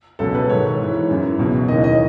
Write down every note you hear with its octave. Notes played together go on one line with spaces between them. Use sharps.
C#2 B2 F#3 A4
B4
G#2 D#3 F#3 C#5
G#2 E3
F#2 E3
C#2 B2 F#3
D#2 C#3 E3 D#5
D#5